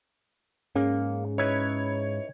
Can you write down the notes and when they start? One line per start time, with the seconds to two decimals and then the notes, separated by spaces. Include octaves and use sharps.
0.75 G#2 A#3 C#4 G#4
1.38 D#4 E4 B4 C#5 G#6